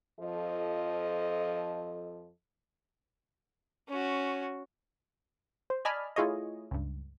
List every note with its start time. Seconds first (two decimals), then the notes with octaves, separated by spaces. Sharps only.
0.19 F2 F3 A4 D#5
3.89 C#4 F#4
5.70 C5
5.85 D5 D#5 G#5 A5 B5 F6
6.16 A3 E4 F4 G#4 C#5 D#5
6.71 C#2 G2